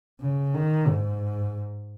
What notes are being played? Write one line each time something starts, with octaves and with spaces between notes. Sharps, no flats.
C#3
D#3
G#2